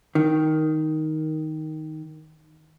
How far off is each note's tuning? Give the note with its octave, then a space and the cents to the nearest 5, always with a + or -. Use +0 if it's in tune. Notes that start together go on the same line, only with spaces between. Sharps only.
D#3 +5